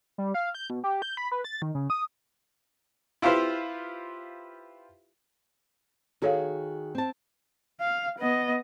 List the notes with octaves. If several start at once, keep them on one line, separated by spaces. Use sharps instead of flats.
G3
F5
G6
B2
G4
G6
B5
B4
A6
D#3
C#3
D#6
E4 F4 G4 B4 C5 F5
D#3 F#4 G#4 A4 C#5 F5
C4 A5
F5
B3 D#5